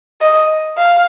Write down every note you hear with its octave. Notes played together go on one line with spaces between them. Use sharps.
D#5
F5